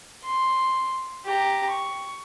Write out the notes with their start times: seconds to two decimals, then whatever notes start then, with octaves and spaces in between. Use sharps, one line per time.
0.24 C6
1.26 G4 A#5
1.70 C#6